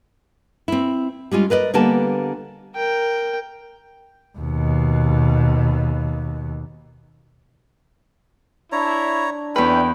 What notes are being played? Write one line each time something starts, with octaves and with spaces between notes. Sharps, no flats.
C4 E4
G3 G#3 C#4 F4
A#4 B4 D5 D#5
D3 G3 A#3 B3 G#5 A5
A#4 G5
D#2 B2
D4 E4 C#5 A#5
E2 C#4 E4 A4 B4 G5